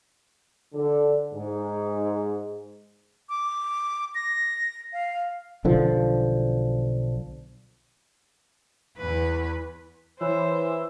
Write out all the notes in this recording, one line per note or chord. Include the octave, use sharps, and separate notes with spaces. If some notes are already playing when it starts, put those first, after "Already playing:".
D3
G#2
D6
A#6
F5
B1 D3 F3
E2 B4
E3 C5 C#5 E5